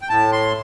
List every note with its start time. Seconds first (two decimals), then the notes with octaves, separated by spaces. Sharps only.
0.02 G5
0.09 A2 A5
0.33 C6